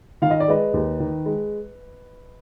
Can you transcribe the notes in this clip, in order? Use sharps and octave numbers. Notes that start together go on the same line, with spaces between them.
D#3 F5
D#5
D5
G#3 B4 D#5
D#2
D#3
G#3